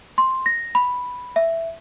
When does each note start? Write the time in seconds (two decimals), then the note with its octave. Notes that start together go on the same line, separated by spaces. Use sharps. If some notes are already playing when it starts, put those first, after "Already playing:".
0.18 C6
0.46 A#6
0.75 B5
1.36 E5